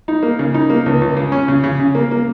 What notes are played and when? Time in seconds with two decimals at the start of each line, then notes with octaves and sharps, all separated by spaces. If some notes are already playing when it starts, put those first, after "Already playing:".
0.08 D#4
0.23 A#3
0.39 C#3
0.54 D#4
0.70 A#3
0.86 C#2
1.01 C#2
1.17 C#3
1.32 C#4
1.48 C#3
1.64 C#3
1.80 C#3
1.95 A#3
2.11 A#3